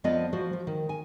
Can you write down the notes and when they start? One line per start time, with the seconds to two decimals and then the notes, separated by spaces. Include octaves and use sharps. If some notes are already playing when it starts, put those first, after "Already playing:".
0.04 F2 F3 B3 D5 D#5 A5
0.33 F3 F#4 C5
0.53 F3
0.67 D#3
0.89 G#5